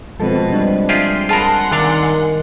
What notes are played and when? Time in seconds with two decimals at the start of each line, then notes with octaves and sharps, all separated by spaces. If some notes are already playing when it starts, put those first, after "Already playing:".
0.20 B2 F3 G#3 C4 A4 B4
0.50 G3 D4
0.89 F4 G4 G#4 E5 C6
1.29 F4 G#4 A#4 F#5 G#5 A5 B5 C6
1.72 C3 D#3 D4 F5